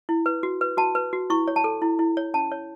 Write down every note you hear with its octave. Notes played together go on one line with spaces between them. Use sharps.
E4
B4
F#4
B4
F#4 A5
B4
F#4
E4 C#6
C#5
A5
A4
E4
E4
C#5
C#4 A5
C#5